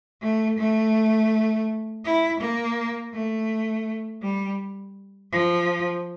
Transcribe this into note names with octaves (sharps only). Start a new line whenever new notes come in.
A3
A3
E4
A#3
A3
G3
F3